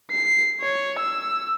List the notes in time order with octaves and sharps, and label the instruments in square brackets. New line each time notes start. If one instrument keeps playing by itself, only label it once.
[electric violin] C7
C#5
E6